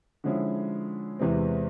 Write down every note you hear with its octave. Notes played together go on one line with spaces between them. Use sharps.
D3 F3 G#3 C#4 E4
E2 C3 E3 G#3 C4